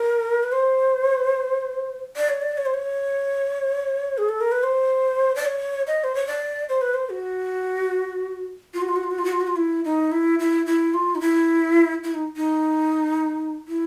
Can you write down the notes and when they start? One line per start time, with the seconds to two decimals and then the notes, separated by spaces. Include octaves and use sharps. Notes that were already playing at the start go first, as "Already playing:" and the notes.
Already playing: A#4
0.43 B4
0.52 C5
2.16 D5
2.29 C#5
2.42 D5
2.57 C#5
2.65 C5
2.74 C#5
4.18 G#4
4.29 A4
4.41 A#4
4.52 B4
4.63 C5
5.36 D5
5.45 C#5
5.87 D#5
6.04 C5
6.15 C#5
6.27 D5
6.69 C5
6.81 B4
6.94 C5
7.10 F#4
8.74 F4
8.82 F#4
8.88 F4
8.96 F#4
9.03 F4
9.11 F#4
9.18 F4
9.25 F#4
9.32 F4
9.40 F#4
9.47 F4
9.56 E4
9.85 D#4
10.11 E4
10.39 E4
10.66 E4
10.94 F4
11.15 D#4
11.20 E4
12.04 E4
12.14 D#4
12.37 D#4
13.68 E4